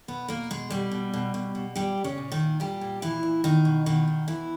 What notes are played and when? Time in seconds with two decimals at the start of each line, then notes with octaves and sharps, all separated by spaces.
0.08 B2 B3 B4
0.28 B2 A#3 A#4
0.50 B2 G#3 G#4
0.70 B2 G3 G4
0.91 B2
1.14 B2
1.34 B2
1.55 B2
1.76 A#2 G3 G4
1.98 A#2
2.04 C#3 C#4
2.18 A#2
2.32 D#3 D#4
2.40 A#2
2.60 A#2 G3 G4
2.81 A#2
3.02 A#2 E3 E4
3.23 A#2
3.44 B2 D#3 D#4
3.65 B2
3.86 B2 D#3 D#4
4.08 B2
4.28 B2 E3 E4